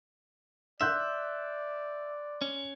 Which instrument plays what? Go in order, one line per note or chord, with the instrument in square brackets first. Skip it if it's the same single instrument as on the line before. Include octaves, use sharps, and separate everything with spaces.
[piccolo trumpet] D5 [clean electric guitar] E5 [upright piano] C6 F#6 G6
[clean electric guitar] C#4